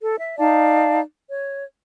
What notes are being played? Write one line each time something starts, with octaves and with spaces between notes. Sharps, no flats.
A4
E5
D#4 D5 F5 A5
C#5